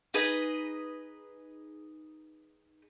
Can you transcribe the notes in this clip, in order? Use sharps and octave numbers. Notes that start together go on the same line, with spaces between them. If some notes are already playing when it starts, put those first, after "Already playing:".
D#4 G#4 B4 D#5